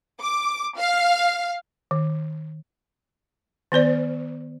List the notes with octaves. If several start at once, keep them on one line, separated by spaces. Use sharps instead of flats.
D6
F5
D#3
D#3 B3 C5 D5